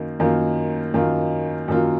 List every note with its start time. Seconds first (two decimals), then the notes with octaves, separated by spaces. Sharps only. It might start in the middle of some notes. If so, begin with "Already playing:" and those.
Already playing: F#2 D#3 A#3
0.20 F#2 D#3 A#3 F4
0.94 F#2 D#3 A#3 F4
1.68 F#2 D#3 A#3 F4